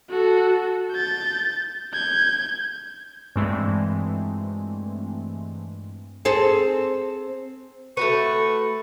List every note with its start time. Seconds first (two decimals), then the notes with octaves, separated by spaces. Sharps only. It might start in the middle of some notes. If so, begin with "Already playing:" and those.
0.10 F#4 A4
0.92 G6 A6
1.94 G6 G#6
3.36 G2 A#2 E3 G#3 A3 C4
6.25 C4 G#4 A4
7.97 A3 F#4 B4 C#6